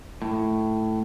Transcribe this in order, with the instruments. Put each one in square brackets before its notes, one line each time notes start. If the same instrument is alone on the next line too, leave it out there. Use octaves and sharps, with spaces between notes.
[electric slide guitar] A2